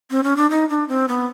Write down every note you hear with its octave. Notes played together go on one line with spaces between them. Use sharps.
C4
C#4
D4
D#4
D4
C4
B3